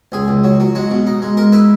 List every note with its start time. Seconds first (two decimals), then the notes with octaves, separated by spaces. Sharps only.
0.12 C#2 G#4
0.28 C#2
0.44 F#3
0.60 F#3
0.75 G#3 F#4
0.91 B2
1.07 D#4
1.22 G#3
1.37 G#3 A#4
1.52 E4 B4